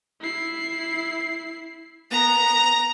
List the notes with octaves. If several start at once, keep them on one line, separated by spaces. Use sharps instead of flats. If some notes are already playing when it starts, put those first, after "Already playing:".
E4 C7
B3 A#5